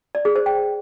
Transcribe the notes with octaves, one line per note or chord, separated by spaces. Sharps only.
D5
G#4
C5
G5